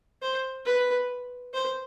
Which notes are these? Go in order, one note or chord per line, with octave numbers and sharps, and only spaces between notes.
C5
B4
C5